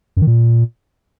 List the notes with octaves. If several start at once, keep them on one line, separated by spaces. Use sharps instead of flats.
F#2
D#3
A#2